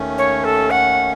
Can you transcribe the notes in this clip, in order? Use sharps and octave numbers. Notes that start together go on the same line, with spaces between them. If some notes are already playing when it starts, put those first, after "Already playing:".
Already playing: D#2 D#3 A3 C#4
C#5
A4
F#5